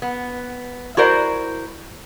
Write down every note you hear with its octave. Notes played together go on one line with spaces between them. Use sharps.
B3
E4 F#4 A#4 C5 D5